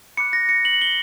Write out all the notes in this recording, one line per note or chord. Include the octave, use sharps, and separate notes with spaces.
B5 D6 F#6 C#7
A#6
C#7
F#7
G7